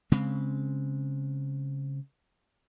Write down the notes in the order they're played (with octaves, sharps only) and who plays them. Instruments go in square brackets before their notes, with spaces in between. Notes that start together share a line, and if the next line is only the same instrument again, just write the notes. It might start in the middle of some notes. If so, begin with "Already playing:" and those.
[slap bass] C#3 G#3 C4